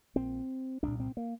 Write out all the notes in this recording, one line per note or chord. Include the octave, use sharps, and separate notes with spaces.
A#1 A#2 C4
C2 A#2 D4
C4
A#3